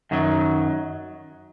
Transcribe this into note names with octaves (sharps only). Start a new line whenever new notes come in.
F#2 D#3 F#3